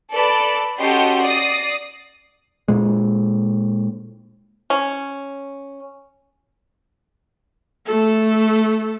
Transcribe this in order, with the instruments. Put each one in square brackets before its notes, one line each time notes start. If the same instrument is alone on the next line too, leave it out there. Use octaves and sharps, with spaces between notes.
[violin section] A4 B4 D5 A5 B5
C#4 F#4 G4 A4 D#5 C6
D5 D#6 A#6 C7
[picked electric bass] A#2 G#3
[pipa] C#4
[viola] A3 A4